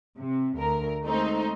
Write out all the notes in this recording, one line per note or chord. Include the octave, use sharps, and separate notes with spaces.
C3
D2 A#4
G#3 A3 C4 D#4 C5